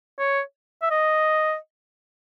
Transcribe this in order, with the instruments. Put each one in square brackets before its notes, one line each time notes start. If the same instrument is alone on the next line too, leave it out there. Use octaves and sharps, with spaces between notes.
[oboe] C#5
E5
D#5